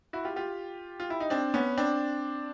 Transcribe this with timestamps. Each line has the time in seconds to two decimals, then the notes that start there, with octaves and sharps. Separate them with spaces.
0.13 E4 F#4
0.25 F4 G4
0.36 F4 G4
1.00 F4
1.10 E4
1.20 D#4
1.30 C4 D4
1.54 B3 C#4
1.77 C4 D4